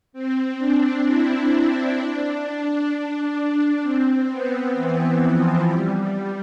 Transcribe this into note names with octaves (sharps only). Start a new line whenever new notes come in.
C4
D4
E4
C4
D4
C4
B3
E3
F3
G3